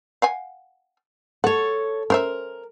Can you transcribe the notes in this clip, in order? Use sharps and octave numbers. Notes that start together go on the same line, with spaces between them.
F5 F#5 G#5
A4 C#5 F#5
C#4 A#4 C5 E5